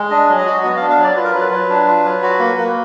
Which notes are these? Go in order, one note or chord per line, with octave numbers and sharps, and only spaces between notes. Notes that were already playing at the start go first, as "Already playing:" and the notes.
Already playing: G#3
D4 D#5
F#3
D#5
F#4
B3 D#5
F5
D4
F5
F#3
D5
F4 B4
A#4
F#3 B4
F#3
D4
F4
F#3
F#4
A#3
A#3